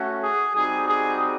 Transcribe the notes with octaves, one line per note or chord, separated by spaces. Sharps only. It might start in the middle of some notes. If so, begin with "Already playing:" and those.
Already playing: A3 C#4 F#4
G#4
G3 C4 D#4 F#4 G#4
G#4